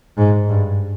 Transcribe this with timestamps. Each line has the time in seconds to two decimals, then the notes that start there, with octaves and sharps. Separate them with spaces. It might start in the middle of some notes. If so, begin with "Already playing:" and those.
0.18 G#2
0.49 G2